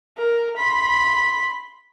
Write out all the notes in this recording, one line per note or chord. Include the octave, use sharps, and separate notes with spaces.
A#4
B5 C6